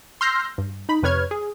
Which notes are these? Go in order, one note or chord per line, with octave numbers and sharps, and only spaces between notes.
C6 E6 F6 G6 A#6 C7
G2
D#4 B5
F2 C3 B4 C#5 F6 G#6
G#4